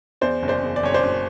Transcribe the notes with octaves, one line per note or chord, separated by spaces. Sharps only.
E2 C5 D5
F#1
C5 D5
E2
D5
F#1 C#5
C5 D5
F#1